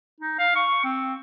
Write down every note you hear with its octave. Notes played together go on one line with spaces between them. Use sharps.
D#4
F5
C#6
C4